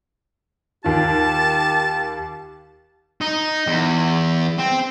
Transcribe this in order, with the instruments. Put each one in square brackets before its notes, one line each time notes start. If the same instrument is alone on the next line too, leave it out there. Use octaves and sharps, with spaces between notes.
[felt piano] D#2 F4 [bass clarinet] G4 [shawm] A5
[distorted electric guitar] D#4
E2
C4